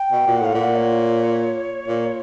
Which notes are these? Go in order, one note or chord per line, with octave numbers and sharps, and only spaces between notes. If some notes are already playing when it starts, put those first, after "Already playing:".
Already playing: G5
B2
A#2
F#5
A2 F5
A#2 F#5
C#5
A#2